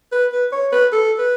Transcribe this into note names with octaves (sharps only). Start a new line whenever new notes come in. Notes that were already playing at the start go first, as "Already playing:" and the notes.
B4
B4
C#5
B4
A4
B4